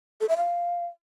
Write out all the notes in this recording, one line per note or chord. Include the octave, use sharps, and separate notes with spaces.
A4
E5
F5